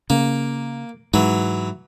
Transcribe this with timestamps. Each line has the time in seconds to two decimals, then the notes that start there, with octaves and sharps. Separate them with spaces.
0.10 C#3 A#3
1.14 G#2 E3 F#3